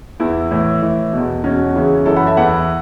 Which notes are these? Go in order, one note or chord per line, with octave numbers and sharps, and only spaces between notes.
E2 E3 E4
A2 E3
A2 E3
E2 B2
E2 B2 C#4 F#4
E2 C#3 E3
F#2 E3 E4 A4
F#5 B5
E5 A5
E2 E3 F#5 B5